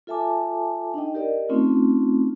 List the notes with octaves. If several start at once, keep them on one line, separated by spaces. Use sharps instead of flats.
F4 A4 E5 G#5 A5 D6
D4 D#4 D#5 G5
G4 A#4 D5 D#5
A3 C4 C#4 D#4 F4